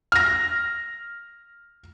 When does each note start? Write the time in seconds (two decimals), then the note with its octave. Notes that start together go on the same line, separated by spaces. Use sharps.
0.12 F6 A#6